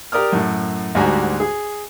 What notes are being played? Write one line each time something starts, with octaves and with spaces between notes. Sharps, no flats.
G4 A#4 D5 D#6 F6
F#2 A2
D2 G#2 G3 F#4 G#5 A#5
G#4